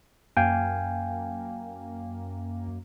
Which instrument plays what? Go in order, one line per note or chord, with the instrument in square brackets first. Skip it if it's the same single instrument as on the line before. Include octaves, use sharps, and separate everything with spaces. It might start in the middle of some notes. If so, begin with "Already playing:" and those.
[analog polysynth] F#2 A#3 [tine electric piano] F5 G5 G#5